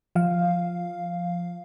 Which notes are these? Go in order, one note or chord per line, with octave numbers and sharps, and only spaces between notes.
F3 F5